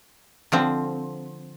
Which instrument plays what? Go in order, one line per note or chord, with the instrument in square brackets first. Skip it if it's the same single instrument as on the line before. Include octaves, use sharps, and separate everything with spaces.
[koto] D3 F3 C4